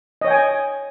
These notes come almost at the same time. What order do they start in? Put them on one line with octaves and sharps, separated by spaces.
D#5 C#5 G5 G#5